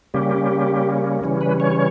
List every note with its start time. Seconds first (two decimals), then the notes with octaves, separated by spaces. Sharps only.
0.14 C#3 G3 A#3 C#4 G4
1.24 C#3 E3 G3 C#4
1.41 B4
1.60 C#5